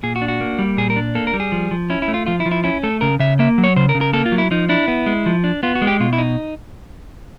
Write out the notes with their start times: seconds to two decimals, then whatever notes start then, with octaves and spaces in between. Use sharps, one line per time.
0.03 A#2 G#4
0.16 F#4
0.22 D4
0.28 F#4
0.41 A#3
0.59 G3
0.77 A#2 G#4
0.90 A#4
0.96 D4
1.15 A#3 A4
1.27 A#4
1.34 G3
1.40 G#4
1.52 F3
1.71 F3
1.90 C#4 E4
2.02 E4
2.08 A3
2.14 F4
2.26 F3 F4
2.40 E4
2.46 F3
2.51 E4
2.64 C#4 E4
2.83 A3 A4
3.01 C#3 A#4
3.19 C#3 E5
3.39 A#3 E5
3.58 F#3
3.64 C#5
3.76 C#3 C5
3.89 A#4
3.95 C#3
4.01 A#4
4.13 A#3 A4
4.26 F4
4.32 F#3
4.38 E4
4.51 F3 D#4
4.69 D4 E4
4.88 B3
5.06 G#3
5.26 F3
5.44 D4
5.63 B3 F4
5.75 F#4
5.82 G#3
5.87 G4
6.00 B2 F4
6.13 E4
6.18 D#4